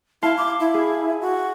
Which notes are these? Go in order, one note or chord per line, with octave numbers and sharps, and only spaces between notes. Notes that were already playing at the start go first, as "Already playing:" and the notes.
E4 F5 A5 C6
D6
E4
G#4
F#4